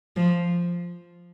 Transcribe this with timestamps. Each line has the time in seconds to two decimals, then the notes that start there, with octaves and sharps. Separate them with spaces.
0.17 F3